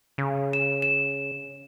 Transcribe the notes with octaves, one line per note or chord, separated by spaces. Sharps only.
C#3
E7
E7